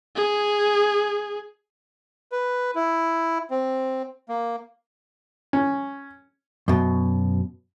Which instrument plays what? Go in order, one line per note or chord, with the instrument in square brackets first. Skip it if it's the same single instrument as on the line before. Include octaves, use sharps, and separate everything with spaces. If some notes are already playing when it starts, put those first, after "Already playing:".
[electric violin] G#4
[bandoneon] B4
E4
C4
A#3
[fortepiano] C#4
[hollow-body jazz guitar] F#2 B2